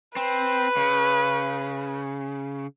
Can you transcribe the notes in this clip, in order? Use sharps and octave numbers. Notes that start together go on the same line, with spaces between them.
C4 B4
C#3